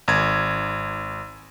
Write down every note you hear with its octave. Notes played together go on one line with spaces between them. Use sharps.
G#1 G#6